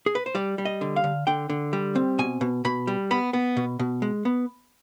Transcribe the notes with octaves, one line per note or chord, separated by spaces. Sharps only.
G#4
B4
C5
G3 D5
G3
D#5
D3
F5
D3
D3 G5
D3
G3
C4
B2 G#5
B2
B2 B5
G3
B3 B5
B3
B2
B2
G#3
B3